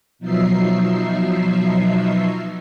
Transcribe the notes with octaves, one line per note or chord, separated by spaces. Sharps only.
B2 F3 F#3 D#4 E5 C7